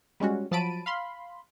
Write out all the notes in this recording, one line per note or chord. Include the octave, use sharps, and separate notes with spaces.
G3 G#3 C#4 F#4
F3 F#3 A5 B5 D7 D#7
F5 B5 C6